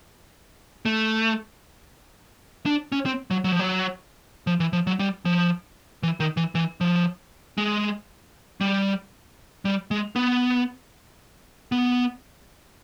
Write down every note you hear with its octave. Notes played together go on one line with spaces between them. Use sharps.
A3
D4
C#4
C4
F#3
F#3
F3
F#3
F3
E3
F3
F#3
G3
F3
E3
D#3
E3
E3
F3
G#3
G3
G3
G#3
B3
B3